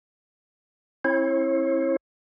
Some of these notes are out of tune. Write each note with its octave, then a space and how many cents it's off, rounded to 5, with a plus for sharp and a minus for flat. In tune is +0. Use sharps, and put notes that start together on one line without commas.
C4 +40 E4 +0 C#5 -40